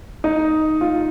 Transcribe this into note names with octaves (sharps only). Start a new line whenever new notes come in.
D#4
F4